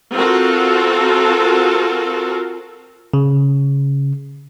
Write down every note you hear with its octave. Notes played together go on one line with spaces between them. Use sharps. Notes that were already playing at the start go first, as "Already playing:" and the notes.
C4 F4 F#4 A4 A#4
C#3